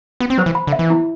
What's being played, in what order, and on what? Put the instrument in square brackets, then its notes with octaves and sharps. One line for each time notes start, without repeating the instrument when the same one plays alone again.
[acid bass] B3 [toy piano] F#4
[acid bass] C4
[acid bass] F#3 [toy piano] C5
[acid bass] E3
[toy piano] B5
[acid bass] D3
[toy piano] E5
[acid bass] E3
[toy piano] E4